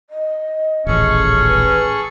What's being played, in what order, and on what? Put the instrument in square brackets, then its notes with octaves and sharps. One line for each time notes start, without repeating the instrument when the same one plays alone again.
[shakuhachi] D#5
[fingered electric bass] D#1 A1 [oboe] C#4 [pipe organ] G#4 A4 C#6
[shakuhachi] B4